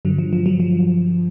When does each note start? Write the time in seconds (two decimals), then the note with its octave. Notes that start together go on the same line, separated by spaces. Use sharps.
0.05 G2 D3 F#3
0.18 F3
0.33 F3
0.46 F#3
0.60 F3